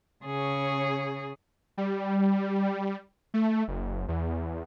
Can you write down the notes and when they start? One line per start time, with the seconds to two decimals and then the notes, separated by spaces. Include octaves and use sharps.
0.23 C#3 G#4 C#5
1.78 G3
3.34 A3
3.68 F#1
4.08 E2